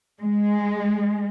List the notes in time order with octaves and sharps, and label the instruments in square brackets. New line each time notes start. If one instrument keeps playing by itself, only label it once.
[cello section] G#3